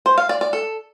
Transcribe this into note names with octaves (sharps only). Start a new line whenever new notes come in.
C5
F5
D5
D5
A4